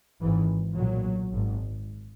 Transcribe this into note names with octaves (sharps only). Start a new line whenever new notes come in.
G#1 G#2 E3
B1 A#2 F#3
G#1 G#2